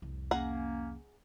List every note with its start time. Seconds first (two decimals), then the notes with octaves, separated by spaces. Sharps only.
0.02 C2 F2
0.31 A#3 C#4 G#4 F#5 A#5